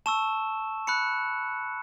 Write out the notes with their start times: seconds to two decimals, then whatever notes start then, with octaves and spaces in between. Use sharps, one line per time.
0.06 A5 C#6 E6 E7
0.87 B5 F#6 C#7